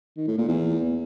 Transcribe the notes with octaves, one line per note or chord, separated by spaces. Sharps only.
D#3
A2
A#2
E2